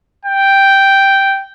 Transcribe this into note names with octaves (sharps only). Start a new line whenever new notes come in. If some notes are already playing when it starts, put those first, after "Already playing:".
G5